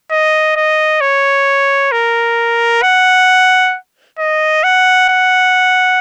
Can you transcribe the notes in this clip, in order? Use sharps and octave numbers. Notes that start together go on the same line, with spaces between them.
D#5
D#5
C#5
A#4
F#5
D#5
F#5
F#5